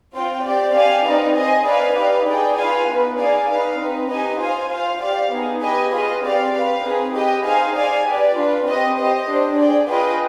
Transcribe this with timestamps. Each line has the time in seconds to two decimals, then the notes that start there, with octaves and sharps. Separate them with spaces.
0.13 C4 F4 C5 G5
0.44 C4 G4 D5
0.74 G4 D5 F5 G#5
1.05 C4 D#4 B4 D5 F5
1.36 G#4 C5 D#5 G#5
1.65 D#4 B4 D5 F5 G#5
1.96 D#4 G4 B4 D5 F5
2.27 D#4 G#4 D5 G5
2.56 F4 B4 F5 G#5
2.87 B3 D#4 B4
3.18 D#4 G#4 D5 F5 G#5
3.49 D#4 B4 F5
3.78 C4 D#4 B4
4.10 D#4 G4 B4 D#5 G#5
4.40 F4 C5 F5 G#5
4.70 F4 C5 F5
5.01 G4 D5 F5
5.32 B3 D#4 G#4
5.61 G4 B4 D#5 G#5
5.92 F4 G#4 B4 D#5
6.23 C4 G4 D5 F5
6.53 G4 B4 F5
6.84 C4 D#4 G#4 B4
7.14 G4 B4 D#5 G5
7.45 D#4 G#4 C5 F5 G#5
7.75 G#4 D5 F5 G#5
8.05 G4 B4 D5
8.36 D4 F4 B4
8.66 C4 G4 B4 D#5
8.97 G4 C5 D#5
9.28 D4 G4 C5
9.58 G#4 D5 G5
9.88 F4 G#4 B4 D#5 G5